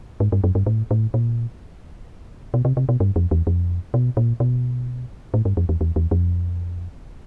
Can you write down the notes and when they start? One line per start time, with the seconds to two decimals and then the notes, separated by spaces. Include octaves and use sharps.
0.20 G#2
0.32 G2
0.44 F#2
0.55 G2
0.66 A2
0.91 A2
1.14 A#2
2.54 B2
2.65 C3
2.77 C3
2.89 B2
3.00 G2
3.16 F2
3.31 E2
3.47 F2
3.94 B2
4.17 A#2
4.40 B2
5.34 A2
5.45 G2
5.57 F2
5.69 E2
5.81 E2
5.96 E2
6.11 F2